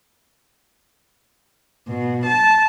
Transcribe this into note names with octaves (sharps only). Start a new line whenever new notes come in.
B2
A5